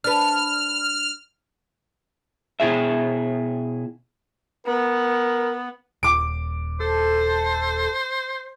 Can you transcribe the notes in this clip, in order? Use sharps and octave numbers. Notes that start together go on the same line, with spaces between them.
D4 B4 F6
B2 E4 G#4 E5
B3 A#4
D#1 D6 D7
A4 C5